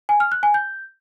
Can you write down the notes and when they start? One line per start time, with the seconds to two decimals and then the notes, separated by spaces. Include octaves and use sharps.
0.09 G#5
0.20 F6
0.32 F#6
0.43 G#5
0.54 G6